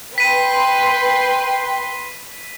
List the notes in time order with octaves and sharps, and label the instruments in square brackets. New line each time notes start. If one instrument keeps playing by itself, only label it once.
[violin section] B4 C6 [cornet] G5 [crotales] B6 D#7